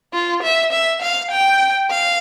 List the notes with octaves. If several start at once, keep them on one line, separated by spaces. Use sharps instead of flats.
F4
E5
E5
F5
G5
F5